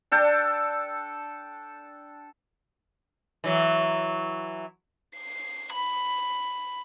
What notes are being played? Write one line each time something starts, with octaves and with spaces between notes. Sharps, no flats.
D4 A4 G5
E3 F#3
C7
B5